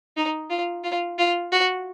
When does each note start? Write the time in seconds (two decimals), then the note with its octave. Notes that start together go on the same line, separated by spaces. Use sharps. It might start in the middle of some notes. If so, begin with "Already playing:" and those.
0.17 D#4
0.50 F4
0.84 F4
1.18 F4
1.52 F#4